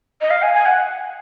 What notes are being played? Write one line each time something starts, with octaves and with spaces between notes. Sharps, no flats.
D#5
F5
G#5
G#5
F#5